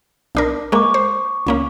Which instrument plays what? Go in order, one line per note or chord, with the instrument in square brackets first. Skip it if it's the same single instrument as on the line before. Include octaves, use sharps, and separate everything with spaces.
[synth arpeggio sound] B1 D4 A#4
[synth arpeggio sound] G#3 A#3 [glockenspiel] C#6 D6
[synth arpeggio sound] C5
C#2 A#3 C#4